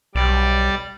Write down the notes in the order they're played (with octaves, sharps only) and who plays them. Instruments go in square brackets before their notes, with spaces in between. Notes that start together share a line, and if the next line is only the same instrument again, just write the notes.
[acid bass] B1 [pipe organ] G3 D5